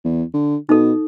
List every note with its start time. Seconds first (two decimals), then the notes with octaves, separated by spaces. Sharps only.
0.04 E2
0.34 D3
0.69 B2 D#4 A4